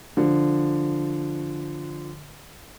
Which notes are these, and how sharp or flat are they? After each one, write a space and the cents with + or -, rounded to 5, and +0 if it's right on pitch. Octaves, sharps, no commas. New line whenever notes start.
D3 +5 F3 +0